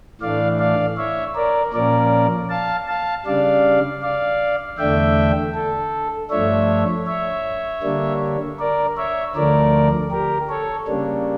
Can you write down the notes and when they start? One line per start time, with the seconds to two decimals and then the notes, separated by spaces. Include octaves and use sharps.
0.21 A2 E3 A3 D4 D5 F5
0.59 D5 F5
0.97 C#5 E5
1.35 A#4 D5
1.73 A#2 F3 A#3 C#4 A#4 D5
2.49 F5 A5
2.88 F5 A5
3.26 C#3 G3 D4 D5 F5
4.02 D5 F5
4.78 E2 D3 A3 D4 E5 G5
5.54 A4
6.30 G2 F3 A3 D4 C#5 E5
7.07 C#5 E5
7.83 D3 G3 A#3 D4
8.59 A#4 D5
8.97 C#5 E5
9.35 D2 D3 F3 A3 A#4 D5
10.11 G4 A#4
10.49 A4 C#5
10.87 C#3 G3 A#3 D4